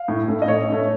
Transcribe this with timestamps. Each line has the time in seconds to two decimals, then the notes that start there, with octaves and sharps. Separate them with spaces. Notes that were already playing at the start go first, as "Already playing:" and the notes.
Already playing: F5
0.08 A2
0.28 A3 C#4
0.42 D#5
0.48 A2 C#5
0.69 A3 C#4